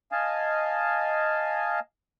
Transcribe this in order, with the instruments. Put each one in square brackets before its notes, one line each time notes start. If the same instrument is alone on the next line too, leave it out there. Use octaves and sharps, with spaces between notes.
[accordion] D#5 F5 G#5 A5